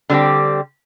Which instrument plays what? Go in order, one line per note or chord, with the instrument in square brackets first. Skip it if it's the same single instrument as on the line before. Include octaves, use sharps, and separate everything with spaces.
[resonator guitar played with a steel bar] D3 G3 C4 G4